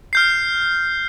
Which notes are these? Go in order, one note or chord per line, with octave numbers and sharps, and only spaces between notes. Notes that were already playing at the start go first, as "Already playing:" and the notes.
F6 G6 C7